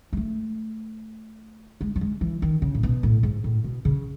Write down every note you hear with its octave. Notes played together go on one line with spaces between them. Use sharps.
G#3
A3
G#3
F#3
G#3
E3
D#3
C#3
A2
B2
A2
G#2
A2
B2
C#3